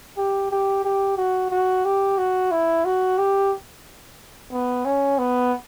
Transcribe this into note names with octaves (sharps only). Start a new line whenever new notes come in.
G4
G4
G4
F#4
F#4
G4
F#4
E4
F#4
G4
B3
C#4
B3